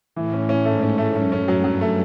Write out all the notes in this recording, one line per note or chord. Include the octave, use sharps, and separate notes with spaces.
A2 E3
C#4
C#4
G#2 A3
C#4
A3
F#2 C#4
C#4
F#3
G2 F#3
A3